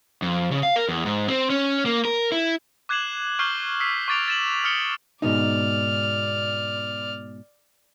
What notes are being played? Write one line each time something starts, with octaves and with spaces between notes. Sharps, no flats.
F2
C#3
F5
A#4
E2
G#2
C4
C#4
A#3
A#4
E4
D6 F#6 G#6 C7 E7 F#7
C#6 F6 G6 C7 G7
E6 B6 C7
C#6 D6 A6 D7 F7
A6 E7 F#7
D#6 F6 A6 C#7 G7
G#2 B2 D#4 D5 F6